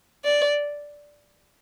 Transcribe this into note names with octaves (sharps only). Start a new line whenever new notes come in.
D5